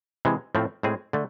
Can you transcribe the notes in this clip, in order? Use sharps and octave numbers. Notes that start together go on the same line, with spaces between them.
C3 E3 G#3
A2 F3 A3 C4
A2 G#3 C4 G#4
D3 A3